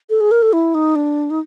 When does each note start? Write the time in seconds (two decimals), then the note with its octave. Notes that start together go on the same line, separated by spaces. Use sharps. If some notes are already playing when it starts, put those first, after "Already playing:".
0.10 A4
0.21 G#4
0.31 A#4
0.42 A4
0.53 E4
0.75 D#4
0.96 D4
1.30 D#4